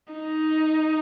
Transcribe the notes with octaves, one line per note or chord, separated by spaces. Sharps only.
D#4